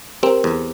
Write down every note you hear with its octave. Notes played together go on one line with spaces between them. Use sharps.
C4 G4 A#4
E2